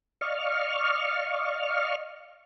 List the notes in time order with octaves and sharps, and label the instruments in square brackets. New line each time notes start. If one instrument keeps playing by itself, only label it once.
[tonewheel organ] D5 D#5 F5 C#6 F6